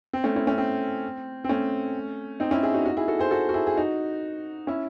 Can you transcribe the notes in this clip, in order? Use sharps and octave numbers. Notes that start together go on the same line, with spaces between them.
C4
A3 C#4
C#4 E4
A3 C#4
C4
C4
A3 C#4
C4 D#4
C#4 E4
E4 G#4
D#4 F#4
D#4 F#4
E4 G#4
F#4 A4
G#4 C5
F#4 A4
F#4
E4 G#4
G#4
D#4 F#4
C#4 E4